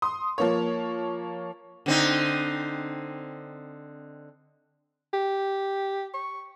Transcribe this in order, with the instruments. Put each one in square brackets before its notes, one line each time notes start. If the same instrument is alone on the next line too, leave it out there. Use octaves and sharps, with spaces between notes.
[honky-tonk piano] C6 D#6
F3 A#3 C#5
[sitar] D3 C4 D#4
[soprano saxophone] G4
C#6